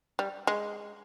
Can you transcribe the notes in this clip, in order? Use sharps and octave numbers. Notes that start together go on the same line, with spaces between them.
G3
G#3